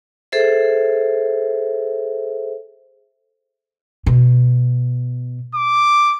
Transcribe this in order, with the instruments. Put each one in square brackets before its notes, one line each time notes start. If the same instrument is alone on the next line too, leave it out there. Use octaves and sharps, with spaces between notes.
[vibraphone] G#4 A4 C5 E5
[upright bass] B2
[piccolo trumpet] D6